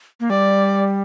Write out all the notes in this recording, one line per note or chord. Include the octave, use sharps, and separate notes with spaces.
A#3
G3 D5